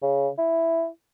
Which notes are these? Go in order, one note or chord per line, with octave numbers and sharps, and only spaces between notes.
C#3
E4